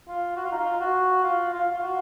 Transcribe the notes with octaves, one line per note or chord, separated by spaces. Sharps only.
F4
F#4
F4
D#4
F4
F#4
F4
F4
F4
F#4